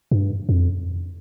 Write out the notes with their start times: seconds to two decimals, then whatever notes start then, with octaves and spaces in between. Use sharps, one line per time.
0.11 G2
0.49 F2